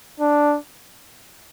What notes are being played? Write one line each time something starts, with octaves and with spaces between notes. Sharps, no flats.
D4